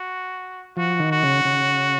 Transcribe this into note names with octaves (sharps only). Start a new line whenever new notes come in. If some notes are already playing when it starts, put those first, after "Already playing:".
Already playing: F#4
F3 F#4
D#3
F#4
C#3
C#3